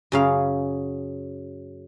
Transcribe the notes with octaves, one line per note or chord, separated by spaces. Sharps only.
F#2 C#3 F5